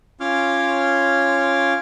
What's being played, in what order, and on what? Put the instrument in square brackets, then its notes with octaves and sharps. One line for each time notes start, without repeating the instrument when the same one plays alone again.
[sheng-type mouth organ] C#4 F4 C#5 C6 D6 F6